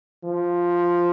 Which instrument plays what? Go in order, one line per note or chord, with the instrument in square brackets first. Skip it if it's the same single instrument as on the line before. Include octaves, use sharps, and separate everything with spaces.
[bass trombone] F3